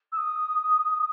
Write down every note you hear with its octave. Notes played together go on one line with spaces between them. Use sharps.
E6
D#6